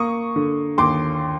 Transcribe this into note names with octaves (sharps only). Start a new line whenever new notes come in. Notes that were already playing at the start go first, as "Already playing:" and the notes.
Already playing: A#3 C#6 D#6
D3
D#2 C6 D6